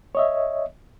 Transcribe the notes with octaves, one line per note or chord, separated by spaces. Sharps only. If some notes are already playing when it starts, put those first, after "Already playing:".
C#5 D#5 E5